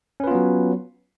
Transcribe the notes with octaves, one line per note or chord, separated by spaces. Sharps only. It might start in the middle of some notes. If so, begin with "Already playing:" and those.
F#3 B3 C#4 F4 B4